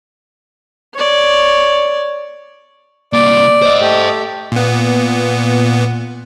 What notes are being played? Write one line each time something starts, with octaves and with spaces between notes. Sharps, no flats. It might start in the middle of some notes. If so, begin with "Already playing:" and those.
C#5 D5
C2 A#3 D5
C5 D#5
A3 G4
A#2 B3